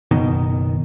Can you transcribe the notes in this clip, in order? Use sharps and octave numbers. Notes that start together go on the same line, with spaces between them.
F#1 B2 D#3